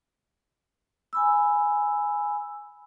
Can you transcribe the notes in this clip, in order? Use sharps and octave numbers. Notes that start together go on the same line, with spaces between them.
G#5 B5 E6